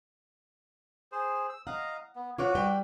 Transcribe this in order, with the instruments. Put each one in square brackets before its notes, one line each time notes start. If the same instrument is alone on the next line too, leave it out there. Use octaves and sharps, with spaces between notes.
[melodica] G#4 C5
E6
[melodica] D#5 F5 A#5 [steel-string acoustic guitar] F#5
[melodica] B3
[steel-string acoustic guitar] F4 B4 C#5 [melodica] F#4 D6
[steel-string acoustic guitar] G3 B4 G5